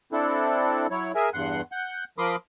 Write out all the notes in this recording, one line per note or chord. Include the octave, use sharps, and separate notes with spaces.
C4 D4 E4 A4
F#3 E4 C#5
G#4 A#4 E5 G#5
E2 G2 F#5 C6 F#6
F#5 G6
F3 A#4 B5 C6 D6 D#6